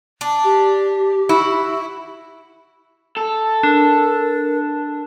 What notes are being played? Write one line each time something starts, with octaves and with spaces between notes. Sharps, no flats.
D4
G4
E4 F#4
A4
D4 A#4